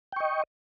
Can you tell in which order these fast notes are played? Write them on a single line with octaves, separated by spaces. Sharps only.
G5 C#6 D#5